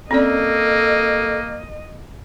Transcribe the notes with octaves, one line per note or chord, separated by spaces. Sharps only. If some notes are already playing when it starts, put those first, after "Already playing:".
A#3 C4 C#4 A4 D5 D#5